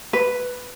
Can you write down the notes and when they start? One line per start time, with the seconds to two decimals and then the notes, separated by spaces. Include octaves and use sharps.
0.13 B4